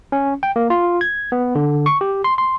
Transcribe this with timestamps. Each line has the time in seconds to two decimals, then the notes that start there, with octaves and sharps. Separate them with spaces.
0.12 C#4
0.43 G5
0.56 A#3
0.70 F4
1.01 G#6
1.32 B3
1.55 D3
1.86 C#6
2.01 G4
2.24 C6
2.38 C6